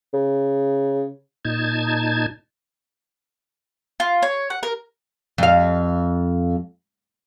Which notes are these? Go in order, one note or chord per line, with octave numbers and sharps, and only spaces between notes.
C#3
A#2 D#4 A5 G#6
F4
C#5
F#5
A#4
F2 F5